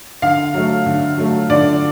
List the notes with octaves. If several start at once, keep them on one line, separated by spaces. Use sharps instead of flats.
D3 F5
F#3 A3
D3
F#3 A3
D3 D5